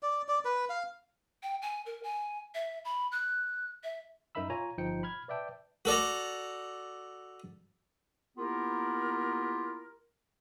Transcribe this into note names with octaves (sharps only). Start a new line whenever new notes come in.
D5
D5
B4
F5
G5
G#5
A#4
G#5
E5
B5
F#6
E5
F#2 D#4 A#4 E5 B5 E6
F4 C#5 G#5 A#5
G1 F3 D#4 G5 C#7
B5 F6 G#6
B4 D5 E5 G5 A5
F#4 A4 D5 A#5
A#3 B3 E4 F4 G4 A#4